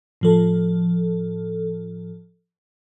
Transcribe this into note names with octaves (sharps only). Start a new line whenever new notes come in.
A2 F3 A4